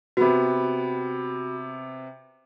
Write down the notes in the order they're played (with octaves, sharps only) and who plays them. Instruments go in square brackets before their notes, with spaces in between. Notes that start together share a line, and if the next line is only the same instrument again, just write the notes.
[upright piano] C3 B3 [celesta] F#4 B5